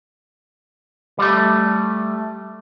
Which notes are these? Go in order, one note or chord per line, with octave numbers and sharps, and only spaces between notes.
G3 A3